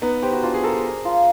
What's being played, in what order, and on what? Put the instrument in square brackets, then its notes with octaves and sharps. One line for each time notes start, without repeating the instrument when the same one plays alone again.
[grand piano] B3 [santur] D#4
[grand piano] G4 [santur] C5
[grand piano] F#4
[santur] D4 [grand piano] F4
[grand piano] G#4
[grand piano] A4 [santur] A#4
[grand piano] G#4
[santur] A#4
F4